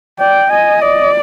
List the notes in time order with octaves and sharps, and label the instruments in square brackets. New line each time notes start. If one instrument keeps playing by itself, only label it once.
[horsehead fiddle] D5 [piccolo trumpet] G5
[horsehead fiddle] D#5 [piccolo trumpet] G#5
[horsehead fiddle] D5 [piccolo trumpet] D#5